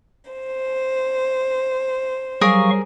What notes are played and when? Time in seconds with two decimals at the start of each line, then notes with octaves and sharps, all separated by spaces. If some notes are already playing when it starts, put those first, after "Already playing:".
0.31 C5
2.41 F#3 G3 G#4 A#4 F5 C#6 D#6